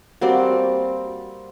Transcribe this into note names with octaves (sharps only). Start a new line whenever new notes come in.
G3 A#3 C4 F#4